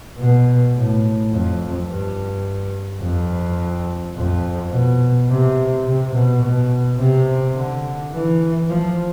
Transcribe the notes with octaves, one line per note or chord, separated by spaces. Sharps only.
B2
A2
F2
G2
F2
F2
B2
C3
C3
B2
B2
C3
D3
E3
F3